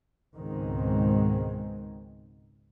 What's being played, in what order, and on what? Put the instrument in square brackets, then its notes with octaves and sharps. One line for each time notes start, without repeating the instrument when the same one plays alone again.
[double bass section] C#2 G#2 B2 D#3 G#3 C4